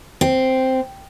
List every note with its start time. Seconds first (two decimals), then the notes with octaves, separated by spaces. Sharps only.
0.21 C4